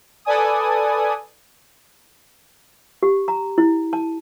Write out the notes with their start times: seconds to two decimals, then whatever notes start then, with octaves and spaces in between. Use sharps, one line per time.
0.25 A4 B4 D5 G#5 D#6
3.03 G4
3.28 A#5
3.58 E4
3.93 A5